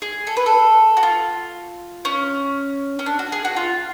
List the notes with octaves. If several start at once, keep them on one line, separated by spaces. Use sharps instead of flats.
G#4
A4
B4
A4
F#4
F4
C#4
C#4
D4
F#4
G#4
F#4
F4